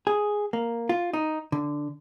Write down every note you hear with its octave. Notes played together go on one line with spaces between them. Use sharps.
G#4
A#3
F4
D#4
D3